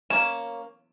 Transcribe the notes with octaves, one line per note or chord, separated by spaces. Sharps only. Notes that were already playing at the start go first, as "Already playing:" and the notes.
A#3 C#4 E7